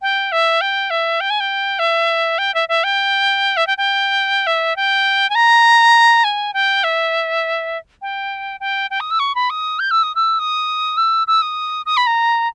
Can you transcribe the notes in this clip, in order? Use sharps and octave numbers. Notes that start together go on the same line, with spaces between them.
G5
E5
G5
E5
G5
G#5
G5
E5
G5
E5
E5
G5
E5
G5
G5
E5
G5
G#5
A#5
G#5
G5
E5
G5
G5
G5
D#6
E6
C#6
B5
D#6
G6
E6
D#6
E6
D#6
E6
E6
D#6
D#6
B5
A#5